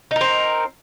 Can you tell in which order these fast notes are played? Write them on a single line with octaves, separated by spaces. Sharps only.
D#4 A#4 C4